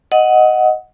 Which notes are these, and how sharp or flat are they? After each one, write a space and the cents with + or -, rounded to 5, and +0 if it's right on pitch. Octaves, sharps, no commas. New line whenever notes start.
D#5 +0 F#5 +0 D#6 +30